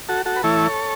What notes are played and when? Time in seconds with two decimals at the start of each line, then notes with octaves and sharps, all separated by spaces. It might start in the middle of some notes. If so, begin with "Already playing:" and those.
0.09 F#4 A4
0.25 F#4 A4
0.36 B4
0.43 E3 A3 E4 A4 C#5